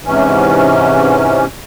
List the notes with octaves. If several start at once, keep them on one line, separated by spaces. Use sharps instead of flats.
G#2 C3 E3 C#4